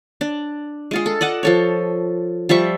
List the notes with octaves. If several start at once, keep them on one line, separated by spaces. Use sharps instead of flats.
D4
G#3 F4 G#4
A4
D5 D#5 F#5 A5
F3 A4 C#5
F3 G3 E5 C#6